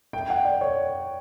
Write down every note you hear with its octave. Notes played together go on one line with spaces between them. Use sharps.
G5
F#5
D5
C#5